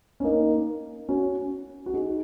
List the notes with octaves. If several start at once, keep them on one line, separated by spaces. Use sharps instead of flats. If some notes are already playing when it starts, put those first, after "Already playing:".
C#4
A#3 D#4
C#4 F#4
F#4
D#4 G#4